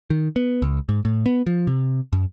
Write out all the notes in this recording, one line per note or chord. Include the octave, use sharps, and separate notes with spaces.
D#3
B3
C#2
G#2
A2
B3
F3
C3
F#2